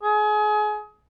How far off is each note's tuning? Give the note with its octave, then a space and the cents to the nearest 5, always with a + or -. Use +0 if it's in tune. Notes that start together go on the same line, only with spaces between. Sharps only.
G#4 +30